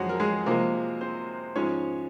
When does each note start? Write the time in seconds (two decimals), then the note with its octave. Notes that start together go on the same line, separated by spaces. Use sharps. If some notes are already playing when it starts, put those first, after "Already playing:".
Already playing: F2 F#3 G#3 F#4
0.09 A#4
0.20 G#3 G#4
0.46 C3 F3 G#3 A#3 A#4
1.01 C4 C5
1.56 G#2 F3 G#3 C#4 C#5